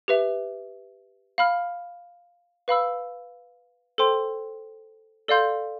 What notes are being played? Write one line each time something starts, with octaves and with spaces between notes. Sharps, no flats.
G4 B4 E5
F5 B5 F6
B4 F5 B5 E6
A4 C5 G5 C6
A4 D5 F5 C6 G6